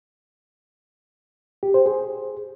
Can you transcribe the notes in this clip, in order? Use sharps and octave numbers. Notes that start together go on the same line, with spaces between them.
G4
C5
G#4